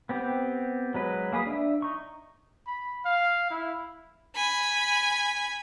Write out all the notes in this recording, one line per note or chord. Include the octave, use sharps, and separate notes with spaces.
B3 C4 G4
F#3 G#3 B4
A#3 G#4 B4 D#6
D4 E5
D#4 C#6
B5
F5
E4
G#5 B5